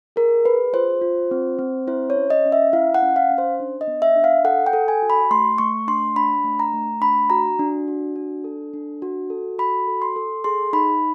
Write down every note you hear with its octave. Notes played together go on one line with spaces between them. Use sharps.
G#4 A#4
G#4 B4
F4 C5
F4
C4
C4
E4 C5
C#5
C#4
D#5
C#4
E5
E4 F5
F#5
C#4
F5
C#4
C5
D4
D#5
B3
E5
D4
F5
A4 F#5
G5
A4
G#5
F#4
B5
A3 C6
A3 C#6
D4 C6
D4 B5
A3
A#5
A3
D4 B5
F#4 A#5
D4
F#4
D4
A4
D4
F#4
A4
F#4 B5
A4
C6
A4
G#4 C6
D#4 B5